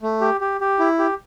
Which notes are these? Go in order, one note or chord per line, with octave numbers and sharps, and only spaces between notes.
A3
G4
G4
G4
E4
G4